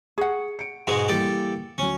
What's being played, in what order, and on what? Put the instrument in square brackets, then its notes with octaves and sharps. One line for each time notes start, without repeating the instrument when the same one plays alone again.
[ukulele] G#4 F#5 [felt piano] C#6
[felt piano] C#7 D7
[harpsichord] G#2 B2 G#3 [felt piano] C6 D#6 C#7
[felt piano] E3 G3 A#3 [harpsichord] G4 A4 D5
[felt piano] D2 F#3 [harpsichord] C#4